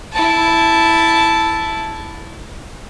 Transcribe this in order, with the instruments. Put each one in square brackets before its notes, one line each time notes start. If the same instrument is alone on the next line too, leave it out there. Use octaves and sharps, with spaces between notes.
[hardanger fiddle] E4 A5